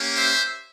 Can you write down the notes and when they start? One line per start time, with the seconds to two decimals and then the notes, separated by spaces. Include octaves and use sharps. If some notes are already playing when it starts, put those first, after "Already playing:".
Already playing: A#3 C#4 G4
0.16 C5 E5